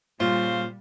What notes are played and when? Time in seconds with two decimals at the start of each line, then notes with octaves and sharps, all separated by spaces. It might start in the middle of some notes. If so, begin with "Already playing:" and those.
0.20 A#2 C#3 G3 F4 C5 F5